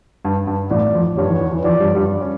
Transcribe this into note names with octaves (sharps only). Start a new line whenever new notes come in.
G2
G2
A1 A2 D5
F2 F3
G2 G3 C#5
E2 E3
E2 E3
E2 E3
F2 F3 D5
G2 G3
G2 G3
D4
C#4